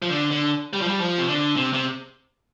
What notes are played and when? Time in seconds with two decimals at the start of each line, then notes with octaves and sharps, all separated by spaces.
0.02 F3
0.10 D3
0.31 D3
0.73 G3
0.81 F3
0.88 G3
1.00 F3
1.18 C3
1.28 D3
1.56 C3
1.73 C3